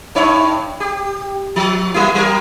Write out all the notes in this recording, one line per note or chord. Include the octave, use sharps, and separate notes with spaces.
G2 D#4 C#5
G4
F3
F#3 A#3 E4
F#3 A#4